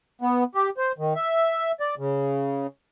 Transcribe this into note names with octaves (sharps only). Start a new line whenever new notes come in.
B3
G4
C5
D#3
E5
D5
C#3